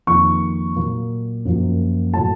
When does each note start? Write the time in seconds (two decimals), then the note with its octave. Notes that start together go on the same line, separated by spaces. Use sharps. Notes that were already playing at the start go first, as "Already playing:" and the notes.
0.07 F2 D#3 A#3 C#6
0.76 A#2 F#3 A#3
1.45 F#2 F3 A#3
2.14 A2 F#3 A3 A5